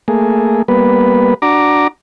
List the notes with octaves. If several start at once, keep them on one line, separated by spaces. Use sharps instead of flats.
A3 A#3 G#4
G3 A#3 B3 B4
D4 F#4 A#5 D6